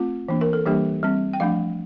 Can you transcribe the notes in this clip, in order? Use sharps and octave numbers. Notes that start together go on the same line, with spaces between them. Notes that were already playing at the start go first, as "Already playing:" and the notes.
Already playing: A3 C4 F4
E3 A#3 D4
A#4
A4
E3 G3 A#3 D4 G4
G3 C4
G5
F3 A3 D4 F5